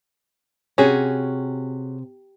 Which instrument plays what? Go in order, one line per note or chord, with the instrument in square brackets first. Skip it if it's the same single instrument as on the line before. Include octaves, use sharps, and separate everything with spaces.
[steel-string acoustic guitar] C3 [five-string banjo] C#4 F#4 G#4